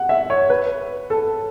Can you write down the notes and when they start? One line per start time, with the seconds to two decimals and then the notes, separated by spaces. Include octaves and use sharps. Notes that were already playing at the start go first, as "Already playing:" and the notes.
Already playing: F#5
0.09 E5
0.30 C#5
0.50 B4
1.10 A4